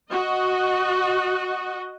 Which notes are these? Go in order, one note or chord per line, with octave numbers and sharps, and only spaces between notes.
F#4 D#5